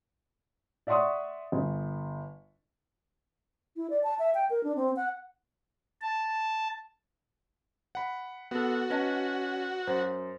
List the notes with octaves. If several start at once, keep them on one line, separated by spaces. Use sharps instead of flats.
D5 E5 F#5 C6 C#6 D#6
G1
E4
D5
A5
E5
G5
A#4
D4
C4
F#5
A5
F#5 B5
B3 F#4 A4
C#4 B4 D#5 A5
F#2 C5